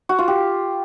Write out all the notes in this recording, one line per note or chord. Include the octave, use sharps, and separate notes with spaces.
F#4
F4
G4